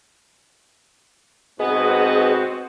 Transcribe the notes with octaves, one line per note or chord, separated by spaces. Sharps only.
G#2 B2 B3 C4 F#4 G#4 D#5